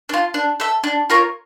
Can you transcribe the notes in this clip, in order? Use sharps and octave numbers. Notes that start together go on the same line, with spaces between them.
D4
F4
D4
A4 E5
D4
F4 A#4 C#5